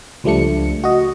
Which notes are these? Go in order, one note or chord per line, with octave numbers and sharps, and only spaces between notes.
C#2 F3 G3 A3 D4 C#7
F#4 D#5